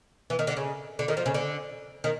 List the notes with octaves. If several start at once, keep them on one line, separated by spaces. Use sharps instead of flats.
E3
D#3
D3
C#3
D3
D#3
F3
C#3
D3
D#3